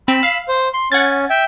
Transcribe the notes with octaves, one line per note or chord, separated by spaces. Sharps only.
C4 B5 E6
F5
C5
C6
C#4 F#5 G#6 A6
E5 G5